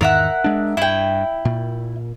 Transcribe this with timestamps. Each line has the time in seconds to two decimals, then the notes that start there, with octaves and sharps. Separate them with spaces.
0.01 E2 G#2 D#3 A#4 E5 F#5
0.44 G#3 D4
0.77 G2 E4 G5
1.45 A#2